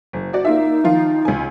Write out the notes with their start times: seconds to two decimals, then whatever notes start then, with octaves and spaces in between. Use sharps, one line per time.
0.13 F#1
0.33 F#4 D5
0.45 A#3 D#4 F4 E5
0.84 D#3 F3 F4
1.25 C#2 G#5